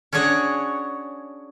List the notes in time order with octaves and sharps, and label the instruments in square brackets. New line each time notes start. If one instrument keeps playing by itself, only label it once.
[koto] C#4 D4 F#4 G#4 C#5